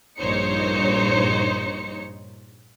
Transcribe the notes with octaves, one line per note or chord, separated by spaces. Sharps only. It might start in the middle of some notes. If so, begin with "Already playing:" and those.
A#1 G2 D#4 C5 C#5 C#7